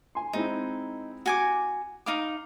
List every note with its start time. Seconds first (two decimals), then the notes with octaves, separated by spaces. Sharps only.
0.15 G#5 C6
0.33 G#3 C4 D#4 E4
1.26 F#4 G#5 D6
2.06 D#4 F5 D6